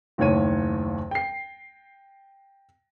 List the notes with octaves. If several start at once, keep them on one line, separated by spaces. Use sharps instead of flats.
F#1 D#2 A2 C#5 D#7
G5 C7